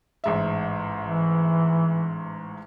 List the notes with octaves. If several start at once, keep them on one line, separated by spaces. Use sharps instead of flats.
A1 G#2 E5
E3